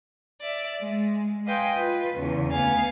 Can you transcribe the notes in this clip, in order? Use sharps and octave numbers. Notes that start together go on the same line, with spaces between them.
D5 E5
G#3
B4 D#5 F5 G5 G#5 C6
F4 B4
E2 C#3
D2 B3 F5 G#5